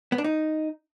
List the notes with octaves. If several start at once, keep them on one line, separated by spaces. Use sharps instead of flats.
B3
D4
D#4